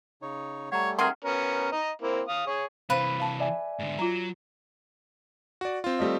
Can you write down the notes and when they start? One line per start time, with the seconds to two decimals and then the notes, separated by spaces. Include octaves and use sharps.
0.22 C#3 D#4 C#5
0.72 G3 A3 C#5 F#5 A#5
0.99 C3 D#3 G#4 F#5 C6 F6
1.25 B3 C#4 A#4
1.72 D#5 A#5
2.02 A#3 C4 E4
2.28 F5 D#6
2.47 G#4 C#5
2.90 C3 E3 B4 C5 F5
3.20 F5 A5
3.40 D5 E5 G#5
3.79 G#2 D3
3.99 F#3 F4 A#5
5.61 F#4 D5
5.84 C4 F4
5.99 G3 A3 D#5